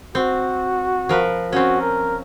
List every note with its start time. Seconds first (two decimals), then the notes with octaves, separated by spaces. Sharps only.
0.15 C4 F#4
1.09 F3 A#4 B4
1.52 C4 C#4 F#4
1.81 A#4